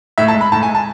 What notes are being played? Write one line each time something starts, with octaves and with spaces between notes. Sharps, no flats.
A2 E5
A5
G#3
B5
A2 A5
G#5
G#3
A5